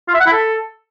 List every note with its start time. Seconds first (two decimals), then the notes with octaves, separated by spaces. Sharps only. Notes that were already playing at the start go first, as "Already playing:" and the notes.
0.08 F4
0.14 E5
0.20 F#5
0.26 E4
0.33 A4